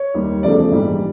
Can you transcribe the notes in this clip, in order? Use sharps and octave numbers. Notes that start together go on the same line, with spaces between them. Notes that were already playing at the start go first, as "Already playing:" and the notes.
Already playing: C#5
D#2 D#3 G3
E2 C#3 F3 A3 D5
A#1 G#2 E3 G3